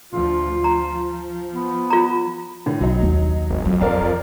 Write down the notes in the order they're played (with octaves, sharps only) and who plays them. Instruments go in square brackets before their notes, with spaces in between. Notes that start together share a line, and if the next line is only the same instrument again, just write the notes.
[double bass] D2 F3 [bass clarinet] F4
[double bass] F3 [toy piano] A#5
[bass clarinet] B3
[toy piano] F4 A#5
[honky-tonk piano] A2 D3
[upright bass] B1 [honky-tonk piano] F#3 D#4
[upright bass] D#2
[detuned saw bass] G#1
[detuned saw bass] F2 [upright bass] F#3
[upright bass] F4 [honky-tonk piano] A#4 D5 F5